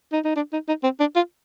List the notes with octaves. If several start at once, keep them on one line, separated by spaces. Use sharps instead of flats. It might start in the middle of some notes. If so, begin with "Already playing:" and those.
D#4
D#4
D4
D#4
D#4
C4
D4
F4